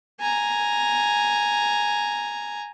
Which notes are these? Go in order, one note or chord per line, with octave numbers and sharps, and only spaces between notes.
G#5 A#5